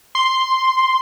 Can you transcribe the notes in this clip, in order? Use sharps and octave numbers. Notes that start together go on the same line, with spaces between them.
C6